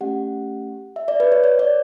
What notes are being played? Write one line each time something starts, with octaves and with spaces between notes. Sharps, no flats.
A3 C#4 G4 F#5
E5
D5
B4
C#5
C#5
D5